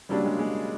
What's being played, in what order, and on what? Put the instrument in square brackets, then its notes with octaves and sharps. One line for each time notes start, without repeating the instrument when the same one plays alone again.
[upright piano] C#3 F#3 A#3 D4 [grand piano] G3
[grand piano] G#3
G#3